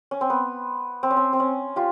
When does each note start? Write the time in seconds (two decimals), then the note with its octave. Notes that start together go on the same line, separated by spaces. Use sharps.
0.11 C#4
0.21 C4
0.30 B3
1.03 C4
1.10 C#4
1.17 C4
1.33 C4
1.40 C#4
1.76 F4 G4